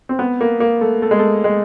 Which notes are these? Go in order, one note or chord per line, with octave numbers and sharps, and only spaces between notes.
C4
B3
A#3
A#3
A3
A3
G#3
A3
G#3